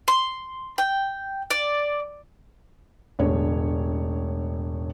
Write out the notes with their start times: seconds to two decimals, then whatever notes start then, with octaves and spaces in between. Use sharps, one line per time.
0.08 C6
0.78 G5
1.50 D5
3.19 E1 A1 D3 C#5